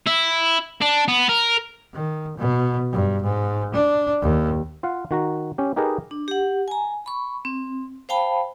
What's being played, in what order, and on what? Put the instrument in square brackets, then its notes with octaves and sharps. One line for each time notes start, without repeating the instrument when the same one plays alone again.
[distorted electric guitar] E4
D4
B3
A#4
[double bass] D#3
B2
G2
G#2
D4
D#2
[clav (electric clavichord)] F4 F5 F#5
D#3 F#4 A#5
C#4 G4
D#4 G4 G#4 A#4 B4 D#5
[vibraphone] D4
G4 F#5
G#5 A#5
B5 C#6
C4
C5 F5 G5 A5 B5